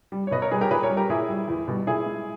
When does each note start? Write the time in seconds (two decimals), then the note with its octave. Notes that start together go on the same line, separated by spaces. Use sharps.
0.12 G3
0.27 C#5
0.31 B2 B4 D#5
0.42 A#4 C#5
0.51 G3 G#4 B4
0.61 G4 A#4
0.71 A#2 G#4 B4
0.83 A#4 C#5
0.90 G3
0.97 G4 A#4
1.09 A#2 E4 G#4
1.29 G3
1.48 E2
1.68 B2 G3
1.87 A#2 E4 G#4
2.06 G#3